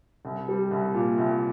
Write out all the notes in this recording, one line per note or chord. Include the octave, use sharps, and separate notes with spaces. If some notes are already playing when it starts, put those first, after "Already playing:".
C2
G3
C2
A#2
C2